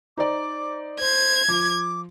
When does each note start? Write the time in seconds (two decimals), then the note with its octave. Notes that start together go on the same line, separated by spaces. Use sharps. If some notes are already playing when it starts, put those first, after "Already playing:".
0.17 D#4 C5 D5 D6
1.00 C5 G#6
1.48 F3 D6